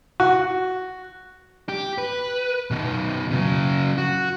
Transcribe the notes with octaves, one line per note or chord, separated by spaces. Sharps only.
F#4
G4
B4
B2 D#3
C#3 F#3
F#4